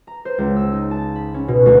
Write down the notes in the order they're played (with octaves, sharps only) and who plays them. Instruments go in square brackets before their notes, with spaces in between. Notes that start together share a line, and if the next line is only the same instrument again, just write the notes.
[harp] A#5
C5
C#2
E6
D#4
A5
B5
C#4
B2
D2